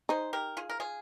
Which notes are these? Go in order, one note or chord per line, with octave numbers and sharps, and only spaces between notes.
D#4 G#4 C5
G4 A#4
F4 G#4
A#4
F4 G#4